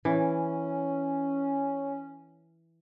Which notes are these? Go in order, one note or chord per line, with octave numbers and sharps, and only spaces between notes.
E3 C#4